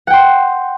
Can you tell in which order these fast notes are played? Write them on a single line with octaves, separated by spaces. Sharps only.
F#5 G5 C6